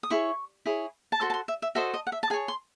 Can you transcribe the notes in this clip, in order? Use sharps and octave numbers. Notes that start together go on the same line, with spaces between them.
D#6
E4 G#4 C#5 C#6
E4 G#4 C#5
A5
F#4 A4 C5 C6
A5
C6
E5
E5
F#4 A4 C5 D#5 E5
D#5
F#5
E5
A5
G#4 C#5 G#5
C6